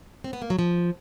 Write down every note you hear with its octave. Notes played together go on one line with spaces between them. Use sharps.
C4
B3
A#3
F#3
F3